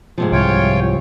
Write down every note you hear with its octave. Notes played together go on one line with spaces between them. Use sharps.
G#2 C3 F3
C2 F4 C#5 G5